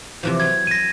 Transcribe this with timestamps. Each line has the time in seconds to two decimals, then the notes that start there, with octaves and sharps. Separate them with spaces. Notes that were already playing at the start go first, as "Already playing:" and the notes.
0.23 C3 E3 F3
0.40 F#3 G#6
0.67 A#6 D#7